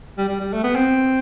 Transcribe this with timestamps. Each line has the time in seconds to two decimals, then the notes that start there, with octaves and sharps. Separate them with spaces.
0.18 G3
0.29 G3
0.41 G3
0.53 A3
0.64 B3
0.75 C4